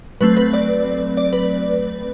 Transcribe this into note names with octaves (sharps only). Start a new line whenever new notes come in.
F#3 A3 C4 B4
B4
D5
D5
B4